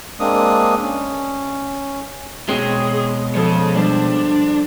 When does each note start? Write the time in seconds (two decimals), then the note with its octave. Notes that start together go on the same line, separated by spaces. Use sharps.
0.20 G#3 A#3 C4 D4 D#6
0.82 C#4
2.49 B2 G#3 C4 G#4 C#5
3.35 F3 G#4 A4 C#5
3.75 G3 D4 C5